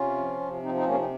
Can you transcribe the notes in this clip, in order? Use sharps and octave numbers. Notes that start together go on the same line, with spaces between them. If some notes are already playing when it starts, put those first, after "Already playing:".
Already playing: C3 C#4 F4
F3
C3
F3 C4 D#4
C4 D#4
C3 A#3 C#4
C4 D#4